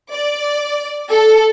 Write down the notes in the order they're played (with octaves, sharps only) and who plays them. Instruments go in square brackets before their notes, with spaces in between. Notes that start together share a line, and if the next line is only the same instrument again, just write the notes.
[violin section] D5
A4